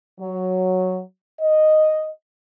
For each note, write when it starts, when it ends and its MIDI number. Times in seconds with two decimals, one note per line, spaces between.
0.20 0.99 54
1.40 2.08 75